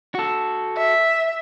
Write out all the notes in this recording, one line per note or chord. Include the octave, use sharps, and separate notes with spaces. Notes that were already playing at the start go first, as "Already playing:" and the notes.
F#4 A4
E5